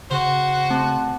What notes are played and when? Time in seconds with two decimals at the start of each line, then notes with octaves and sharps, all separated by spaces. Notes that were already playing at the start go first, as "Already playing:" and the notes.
0.11 C#3 F#4 C5
0.70 A3 C4 A5